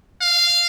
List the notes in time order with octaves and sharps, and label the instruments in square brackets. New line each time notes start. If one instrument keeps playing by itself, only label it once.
[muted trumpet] F5